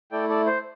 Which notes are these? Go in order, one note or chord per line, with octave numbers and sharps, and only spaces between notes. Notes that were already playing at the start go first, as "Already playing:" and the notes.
A3 E4 A4 D5 G5
A4 D5
C5